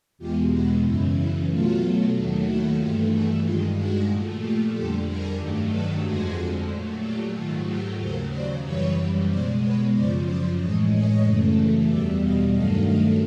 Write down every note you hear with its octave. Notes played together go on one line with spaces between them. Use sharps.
E2 B2 G#3 F4 G4
E4 F#4
F#2 C#3 E3 E4
E4
B2 F#3 A3 F4
D#2 D#3 F#3 A3
E4 F#4
G2 E3 A3 F4 G4
F#4 G#4
G2 D#3 G#3 F4 G4
F#4 G#4
A#2 F3 A3
F4 G4
F2 D3 G3 G4 A4
G#4 A#4
G2 D#3 F#3 A3
A4 B4
F2 D3 F3 G#3 F#4 G#4
A#2 F#3 A3
F4 G4
G#2 D#3 F#3 A3 F4
F4 G4
D#2 C#3 F#3 A#4 C5
C5 D5
F#2 C#3 E3 G3 B4 C#5
B2 G#3 C5 D5
B4 C#5
F#2 C#3 F3 C5 D5
C5 D5
A2 E3 G#3 C#5 D#5
C#5 D#5
F#2 C#3 E3 A3
E2 B2 G3 D5 E5
D#5 F5
G2 D#3 F#3 A3 D#5 F5
D#5 F5